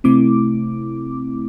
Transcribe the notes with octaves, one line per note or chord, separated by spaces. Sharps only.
C3 A3 C4 E4 D6